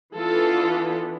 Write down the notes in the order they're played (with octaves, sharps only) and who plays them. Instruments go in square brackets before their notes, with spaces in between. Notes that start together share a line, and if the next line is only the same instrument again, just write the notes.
[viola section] E3 B3 D4 F4 A4